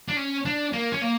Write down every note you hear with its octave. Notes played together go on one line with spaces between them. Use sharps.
D4
C#4
D4
A#3
C#4
A#3